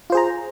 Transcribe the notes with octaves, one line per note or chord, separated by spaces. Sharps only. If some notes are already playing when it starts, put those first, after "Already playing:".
F4 G#4 C5 A#5